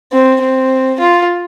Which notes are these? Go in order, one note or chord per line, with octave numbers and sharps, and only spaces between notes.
C4
C4
F4